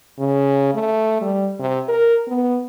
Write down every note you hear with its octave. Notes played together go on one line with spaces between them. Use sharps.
C#3
A3
G3
C3
A#4
B3